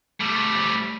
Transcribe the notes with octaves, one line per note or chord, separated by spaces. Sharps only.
G3 A3